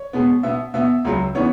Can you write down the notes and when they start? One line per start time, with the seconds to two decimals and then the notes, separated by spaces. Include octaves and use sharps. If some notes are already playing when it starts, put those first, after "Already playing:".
Already playing: C#5
0.13 B2 G#3 B3
0.43 B2 B3 E5
0.74 B2 B3 E5
1.05 C#2 C#3 F#3
1.35 C#3 E3 B3 C#5